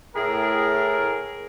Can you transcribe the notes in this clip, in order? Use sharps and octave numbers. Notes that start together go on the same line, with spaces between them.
A2 G#4 A#4